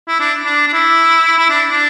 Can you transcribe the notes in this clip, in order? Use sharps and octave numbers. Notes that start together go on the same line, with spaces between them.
E4
D4
D4
D4
E4
E4
D4
D4